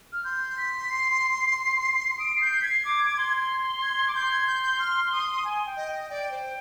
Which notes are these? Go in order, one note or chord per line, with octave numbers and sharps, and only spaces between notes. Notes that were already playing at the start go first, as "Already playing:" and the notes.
F6
C6 G6
B6
C7
D#6 D7
C7
G6
C7
G#6 B6
C7
D6
D6
C6
G#6
D6
C6 G6
G#6
G6
G6
F6
D#6
G#5
G5
D#5
G5
D5 G5
C5